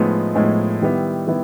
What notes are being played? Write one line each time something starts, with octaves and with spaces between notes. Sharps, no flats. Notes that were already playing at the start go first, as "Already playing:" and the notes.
Already playing: A2 F3 G#3 B3 D#4
A2 F3 G#3 B3 D#4
D#3 G3 B3 E4
D#3 G3 B3 E4